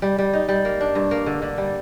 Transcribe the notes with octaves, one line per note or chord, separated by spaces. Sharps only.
G3
G3
D#4
G3
A#3
D4
G2
A#3
D3
D3
G3